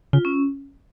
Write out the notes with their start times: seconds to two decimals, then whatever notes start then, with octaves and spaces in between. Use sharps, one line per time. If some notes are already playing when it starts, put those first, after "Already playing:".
0.13 C#3 F4
0.25 C#4